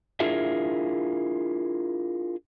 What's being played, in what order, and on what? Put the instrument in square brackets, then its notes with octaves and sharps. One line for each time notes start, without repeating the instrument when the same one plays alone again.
[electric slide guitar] D4 E4 F4 G#4 A#4 E5